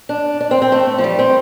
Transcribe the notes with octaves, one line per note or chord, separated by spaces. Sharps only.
D4
D4
C4
C4
A3
F3
G3
C4